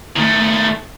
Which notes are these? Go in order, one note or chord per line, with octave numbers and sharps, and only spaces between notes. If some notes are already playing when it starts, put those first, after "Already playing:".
D#3 A3